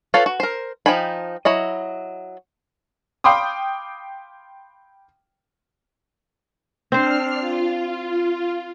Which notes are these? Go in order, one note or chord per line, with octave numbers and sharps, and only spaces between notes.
F4 A4 B4 C#5 F5
F#4
A#4 C5
F3 D#4 G5 G#5 B5
F#3 E4 D#5
F5 G5 B5 C6 D6 D#6
C4 D4 C5 F6 C7
F4